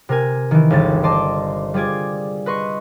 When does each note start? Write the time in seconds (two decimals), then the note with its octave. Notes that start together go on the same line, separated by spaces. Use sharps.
0.09 C3 A#4 G#5
0.51 D#3 E3
0.70 G1 C#2 A6
1.03 C5 D5 D#5 A5 C6 D6
1.74 G3 F4 G#4 D5 G#6
2.46 B4 D#5 C6 C#6